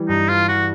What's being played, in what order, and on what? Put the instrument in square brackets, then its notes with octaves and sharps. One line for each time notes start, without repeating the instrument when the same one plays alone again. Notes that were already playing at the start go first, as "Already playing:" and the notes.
Already playing: [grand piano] E3 G3
[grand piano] G2 [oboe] D#4
[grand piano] E3 [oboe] F4
[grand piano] E3 [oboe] F#4